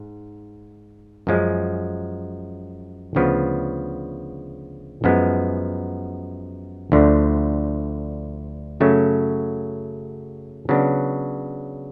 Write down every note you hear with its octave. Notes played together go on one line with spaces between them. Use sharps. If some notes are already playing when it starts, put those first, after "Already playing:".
Already playing: G#2
F#2 F3 G#3 C#4
D2 C#3 F3 B3
F#2 F3 G#3 B3
D2 D3 F3
F#2 C#3 F#3 A3 C#4
C#3 F#3 B3 D4